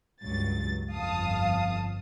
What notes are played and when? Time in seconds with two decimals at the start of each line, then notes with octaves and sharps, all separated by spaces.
0.22 C#2 G2 F#3 A6
0.95 G1 F2 F5 A5 D#6